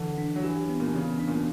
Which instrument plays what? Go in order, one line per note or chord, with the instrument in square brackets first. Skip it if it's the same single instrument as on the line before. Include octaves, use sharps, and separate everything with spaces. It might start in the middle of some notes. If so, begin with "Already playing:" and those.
Already playing: [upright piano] D3 [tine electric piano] E3
[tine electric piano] D4
[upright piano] F#3
[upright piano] E3 [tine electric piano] G4
[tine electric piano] B3
[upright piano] A#2
B2
[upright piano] C#3 [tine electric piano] E3
[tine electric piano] D4
[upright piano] A#2
B2